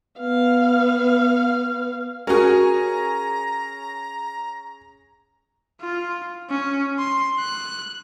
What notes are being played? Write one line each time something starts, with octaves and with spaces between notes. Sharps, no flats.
B3 F5
C#4 F#4 G#4 A#4 A#5
F4
C#4
C6
F#6